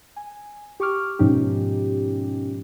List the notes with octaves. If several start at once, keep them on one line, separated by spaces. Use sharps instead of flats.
G#5
G4 C#6 D6 F6
G#2 B2 F3 C#4 D#4 G4